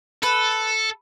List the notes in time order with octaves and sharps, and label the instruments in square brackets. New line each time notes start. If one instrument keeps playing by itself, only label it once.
[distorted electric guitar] A4 [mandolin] B4